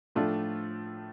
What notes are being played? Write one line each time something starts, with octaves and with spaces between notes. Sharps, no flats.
A2 F3 A3 D4 F4